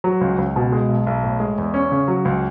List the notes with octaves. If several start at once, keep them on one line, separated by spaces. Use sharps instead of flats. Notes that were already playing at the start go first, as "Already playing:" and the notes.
F#3
C#2
C#2
B2
G#3
B1
B1
A2
G#3
E2
C#4
C#3
F#3
C#2